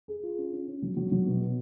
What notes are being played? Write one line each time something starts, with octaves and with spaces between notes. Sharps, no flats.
G#4
F4
C#4
C#4
C#4
F#3
F#3
F#3
B2
B2